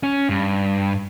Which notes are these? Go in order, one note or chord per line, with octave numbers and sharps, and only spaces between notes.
C#4
G2